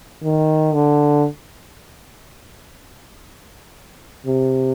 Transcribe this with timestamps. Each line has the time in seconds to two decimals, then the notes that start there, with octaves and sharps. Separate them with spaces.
0.23 D#3
0.73 D3
4.26 C3